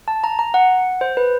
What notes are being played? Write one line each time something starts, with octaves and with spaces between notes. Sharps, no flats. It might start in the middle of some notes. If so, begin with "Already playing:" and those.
A5
A#5
A#5
F#5
C5
B4